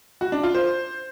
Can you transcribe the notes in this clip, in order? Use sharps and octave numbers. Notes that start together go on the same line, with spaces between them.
F#4
D4
F4
C5